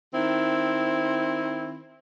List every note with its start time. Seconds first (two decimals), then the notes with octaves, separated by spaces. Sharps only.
0.14 D#3 C4 E4